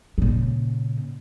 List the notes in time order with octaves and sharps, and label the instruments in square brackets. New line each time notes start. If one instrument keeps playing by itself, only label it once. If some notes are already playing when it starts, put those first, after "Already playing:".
[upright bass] A#2 C#3